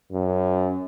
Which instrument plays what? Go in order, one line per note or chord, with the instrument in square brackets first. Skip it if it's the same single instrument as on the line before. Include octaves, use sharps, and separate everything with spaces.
[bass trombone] F#2